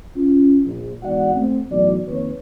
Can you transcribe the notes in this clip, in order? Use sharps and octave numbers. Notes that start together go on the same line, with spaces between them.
C#4 F4
A#1
E2 G#2 F#4 D5 F#5
A3 C4
B1 A2 E3 F#3 F#4 D5
F2 D#3 A#3 C4 B4 C#5